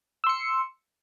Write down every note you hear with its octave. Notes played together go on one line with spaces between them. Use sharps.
C6 E6 C#7